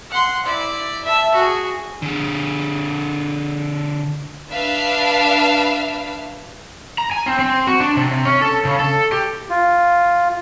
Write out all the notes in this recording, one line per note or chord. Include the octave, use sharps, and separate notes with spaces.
F#5 C6
E4 D5
E5 A5
F#4 G#4
D3 G#4
D4 B4 E5 F5
A#5
G#5
C4
C4
F#4
D4
C3
C#4
A4
C#3
A4
G4
F4